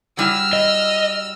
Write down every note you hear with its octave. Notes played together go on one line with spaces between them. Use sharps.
F#3 G3 E4 E6 F6
D#5